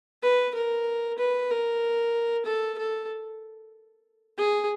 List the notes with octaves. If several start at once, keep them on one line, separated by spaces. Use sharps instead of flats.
B4
A#4
B4
A#4
A4
A4
G#4